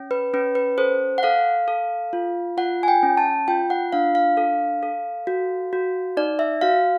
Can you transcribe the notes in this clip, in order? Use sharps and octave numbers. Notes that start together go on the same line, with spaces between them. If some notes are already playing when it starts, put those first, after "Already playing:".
Already playing: C#4
B4
C#4 B4
B4
A4 C5
F#5
A4 F5
A4
F4
F4 F#5
G#5
G5
C#4
A5
F4 G5
F#5
D4 F5
F5
A4
A4
F#4
F#4
D#4 D5
E5
F#4 F5